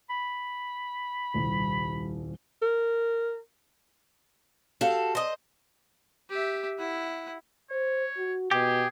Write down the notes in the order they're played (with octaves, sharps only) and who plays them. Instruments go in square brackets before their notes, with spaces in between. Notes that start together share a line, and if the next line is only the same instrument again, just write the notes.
[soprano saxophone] B5
[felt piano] D#1 C2
[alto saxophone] A#4
[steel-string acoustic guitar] F#4 G4 F5 [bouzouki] A4
[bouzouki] C5 D#5
[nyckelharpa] G4 E5
E4 F#5
[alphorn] C5 [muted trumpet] C#5
[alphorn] F#4
[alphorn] B2 [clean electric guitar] G4 [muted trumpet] G#4